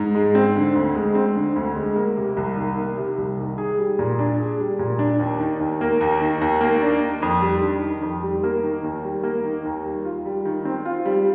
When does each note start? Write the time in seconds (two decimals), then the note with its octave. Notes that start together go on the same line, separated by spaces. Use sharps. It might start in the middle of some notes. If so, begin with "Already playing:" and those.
Already playing: G#2
0.15 G#3
0.35 C4
0.56 D3
0.75 D2
0.95 G#3
1.15 C4
1.35 D3
1.56 D2
1.76 G#3
1.96 A#3
2.17 C3
2.37 C2
2.57 D#3
2.78 A#3
2.98 C3
3.18 C2
3.38 D#3
3.58 G#4
3.78 G3
3.99 A#2
4.19 D4
4.40 G#4
4.60 G3
4.79 A#2
4.99 D4
5.19 D#2
5.40 D#3
5.60 D#2
5.81 A#3
6.01 D#2
6.21 D#3
6.41 D#2
6.61 A#3
6.82 D4
7.01 D#3
7.22 F2
7.42 G3
7.62 D4
7.82 D#3
8.03 F2
8.23 G3
8.43 A#3
8.64 D#3
8.84 D#2
9.04 G3
9.23 A#3
9.44 D#3
9.65 D#2
9.85 G3
10.05 F4
10.26 G3
10.45 D#3
10.65 C4
10.85 F4
11.06 G3